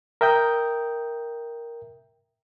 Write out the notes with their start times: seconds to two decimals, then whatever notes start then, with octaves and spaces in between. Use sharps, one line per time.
0.21 A#4 E5 G5 D#6 G6